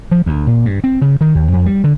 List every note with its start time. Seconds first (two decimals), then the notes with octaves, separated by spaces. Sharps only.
0.12 F3
0.26 D2
0.47 A#2
0.65 G2
0.84 C4
1.02 C#3
1.21 D#3
1.35 D#2
1.52 F2
1.66 G3
1.84 D3